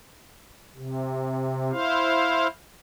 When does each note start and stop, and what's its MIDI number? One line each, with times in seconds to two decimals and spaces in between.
0.77 1.72 48
1.72 2.47 64
1.72 2.47 72
1.72 2.47 77